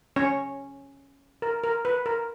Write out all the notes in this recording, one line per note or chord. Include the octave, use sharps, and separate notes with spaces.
C#4 C#5
A#4
A#4
B4
A#4